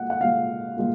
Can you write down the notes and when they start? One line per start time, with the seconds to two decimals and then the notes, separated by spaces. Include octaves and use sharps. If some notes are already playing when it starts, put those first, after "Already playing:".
Already playing: A#2 G#3 F#5
0.10 F#5
0.21 A#2 G#3 F5
0.77 A#2 G#3